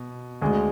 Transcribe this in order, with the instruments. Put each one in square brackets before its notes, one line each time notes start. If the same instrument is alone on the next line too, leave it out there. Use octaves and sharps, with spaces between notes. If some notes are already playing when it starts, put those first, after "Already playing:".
Already playing: [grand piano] B2
D2 D3 G#3